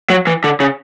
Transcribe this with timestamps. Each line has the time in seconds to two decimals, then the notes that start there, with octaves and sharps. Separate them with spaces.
0.10 F#3
0.27 E3
0.44 D3
0.60 C#3